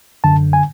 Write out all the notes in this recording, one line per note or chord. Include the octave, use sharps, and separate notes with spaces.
F#2 D3 A5
G#5